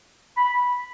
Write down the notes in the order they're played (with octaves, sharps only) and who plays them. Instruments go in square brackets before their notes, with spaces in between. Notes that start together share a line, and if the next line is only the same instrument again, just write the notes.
[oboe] B5